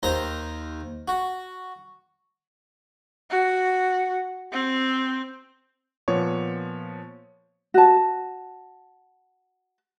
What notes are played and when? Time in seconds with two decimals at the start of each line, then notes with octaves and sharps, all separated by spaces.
0.03 D#2 C5 A#5
1.08 F#4
3.30 F#4
4.52 C4
6.08 A#2 F3 B3 C#5 C#6
7.74 F#4 A5